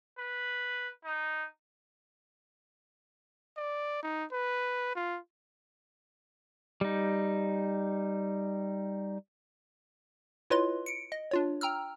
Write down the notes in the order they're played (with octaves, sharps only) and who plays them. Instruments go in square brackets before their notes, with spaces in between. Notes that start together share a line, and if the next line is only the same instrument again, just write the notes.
[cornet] B4
D#4
[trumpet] D5
D#4
B4
F4
[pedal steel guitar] G3 D#4
[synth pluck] E4 F4 B4 C#5 D#5 C6
C#7 D7
D#5
D4 F4 C#5
G5 A#5 E6 F6